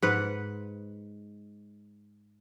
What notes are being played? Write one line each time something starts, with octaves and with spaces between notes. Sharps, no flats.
G#2 B4 F#5